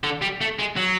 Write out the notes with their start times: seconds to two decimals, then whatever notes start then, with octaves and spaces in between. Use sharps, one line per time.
0.04 D3
0.22 G3
0.41 A3
0.59 G#3
0.77 F#3